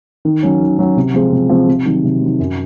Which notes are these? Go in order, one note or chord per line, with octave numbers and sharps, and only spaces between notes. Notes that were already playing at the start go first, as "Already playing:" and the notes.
D#3
F#3 C#4
D#3
F#3 C#4
C3
F3 G#3 C4 F4
C3
F3 G#3 C4 F4
C3
D#3 F#3
C3
D#3 F#3
F#2